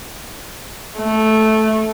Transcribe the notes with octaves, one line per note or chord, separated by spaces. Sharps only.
A3